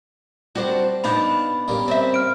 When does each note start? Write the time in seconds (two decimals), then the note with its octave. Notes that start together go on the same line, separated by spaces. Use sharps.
0.55 G3 C4 D4 F#4
1.04 B3 D4 D#4 F5 F#5 B5
1.68 C#3 G3 A#3
1.88 C4 E5
2.14 F6 D7